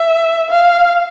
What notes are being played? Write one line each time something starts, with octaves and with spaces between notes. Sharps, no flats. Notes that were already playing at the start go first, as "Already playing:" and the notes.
Already playing: E5
F5